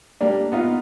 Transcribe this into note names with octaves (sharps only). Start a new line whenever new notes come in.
G3 A#3 D4
B3 D#4 F4